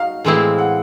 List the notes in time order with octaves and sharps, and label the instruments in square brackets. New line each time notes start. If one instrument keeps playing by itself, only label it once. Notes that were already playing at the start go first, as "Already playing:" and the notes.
Already playing: [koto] D#4 F#4 [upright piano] F5
[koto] A2 E3 G#3 C4 E4
[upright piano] F#5